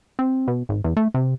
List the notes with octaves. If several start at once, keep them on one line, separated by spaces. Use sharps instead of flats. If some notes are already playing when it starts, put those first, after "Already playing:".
C4
B2
G#1
E2
A3
C3